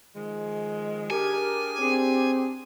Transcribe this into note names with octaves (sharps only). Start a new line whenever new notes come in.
D#3 F3 G#3
D4 G4 G#4 A#4 G#5
C4 D4 G#4